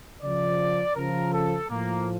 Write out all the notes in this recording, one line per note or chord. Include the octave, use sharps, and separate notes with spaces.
C#3 F3 D5
C#3 F3 A#4
A4
A2 F3 A#3